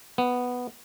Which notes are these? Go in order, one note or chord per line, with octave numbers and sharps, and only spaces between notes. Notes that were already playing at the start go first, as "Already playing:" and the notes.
B3